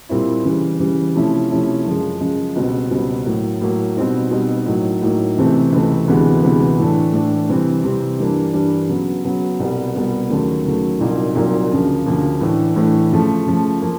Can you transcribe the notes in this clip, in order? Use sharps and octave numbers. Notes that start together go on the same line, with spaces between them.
A#2 G3 C4 E4
C#3 E3 G3
C#3 E3 G3
C3 F3 A3 C#4 E4
C3 F3 A3 C#4 E4
F#2 C#3 F3 G#3
F#2 C#3 F3 G#3
C#2 B2 G3 C4
C#2 B2 G3 C4
A2 F#3 A#3
A2 F#3 A#3
B2 G3 C4 D#4
B2 G3 C4 D#4
A2 F#3 A#3 D#4
A2 F#3 A#3 D#4
C#2 C3 E3 A3 C4
C#2 C3 E3 A3 C4
D2 C3 E3 G#3 B3
D2 C3 E3 G#3 B3
A2 E3 A3 D4
A2 E3 A3 D4
C3 E3 G3 C4
C3 E3 G3 C4
G2 E3 G3 A#3 D4
G2 E3 G3 A#3 D4
C#3 F#3 B3
C#3 F#3 B3
C2 B2 G3 B3
C2 B2 G3 B3
D#2 C#3 F#3 A3
D#2 C#3 F#3 A3
C2 A#2 F#3 A#3 D#4
C2 A#2 F#3 A#3 D#4
D2 C#3 F3 A#3
D2 C#3 F3 A#3
A2 E3 A3 D4
A2 E3 A3 D4
C#3 F3 A3
C#3 F3 A3
F3 A#3